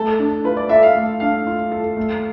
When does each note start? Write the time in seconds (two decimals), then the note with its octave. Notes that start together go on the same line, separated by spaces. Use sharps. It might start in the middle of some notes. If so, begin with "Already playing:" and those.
Already playing: A3 A4
0.19 D4
0.44 F4 B4
0.57 D5
0.69 A4 E5
0.83 F5
0.95 A3
1.20 D4 F5
1.47 F4
1.72 A4
1.97 A3